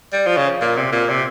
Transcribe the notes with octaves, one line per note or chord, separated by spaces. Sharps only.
G3
F3
C#3
A#2
C3
A#2
C3